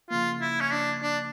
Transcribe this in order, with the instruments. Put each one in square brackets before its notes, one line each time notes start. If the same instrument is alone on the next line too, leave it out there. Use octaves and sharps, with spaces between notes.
[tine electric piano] C#3 F3 A#3 [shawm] F4
[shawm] E4
C#4
D4
D4